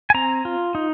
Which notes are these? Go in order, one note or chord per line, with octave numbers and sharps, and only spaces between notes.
G#5
C4 A#5
F4
D#4